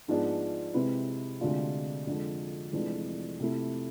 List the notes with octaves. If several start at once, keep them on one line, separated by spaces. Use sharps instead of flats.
G#2 F3 B3 D4 G#4
C3 G#3 C4 E4 B4
D2 C3 G#3 D4 F4
F2 D3 F3 G#3
F1 F2 E3 G#3 D4
C3 F3 A3 E4